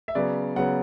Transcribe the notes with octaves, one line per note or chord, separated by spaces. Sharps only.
E5
C#3 F#3 B3 D5
C#3 F#3 B3 F#5